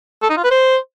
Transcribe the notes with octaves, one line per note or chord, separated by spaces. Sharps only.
A4
D#4
F4
B4
C5